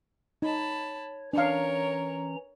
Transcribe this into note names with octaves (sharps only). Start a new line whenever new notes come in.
D#4 C#5 A5 B5
E3 C#4 D4 A#4 C#5 F5 A#5